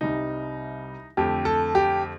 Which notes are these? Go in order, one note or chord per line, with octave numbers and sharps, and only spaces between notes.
C2 C3 G3 D#4
F2 D3 A3 G4
A4
G4